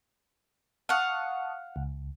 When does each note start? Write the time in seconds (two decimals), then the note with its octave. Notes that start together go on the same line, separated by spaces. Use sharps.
0.89 F5 F#5 A5 C#6 D#6
1.76 C#2